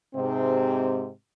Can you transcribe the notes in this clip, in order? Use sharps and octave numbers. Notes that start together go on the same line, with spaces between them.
G#2 C3 C4